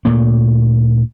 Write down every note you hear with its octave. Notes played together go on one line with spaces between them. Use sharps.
D2 A#2 A3 A#3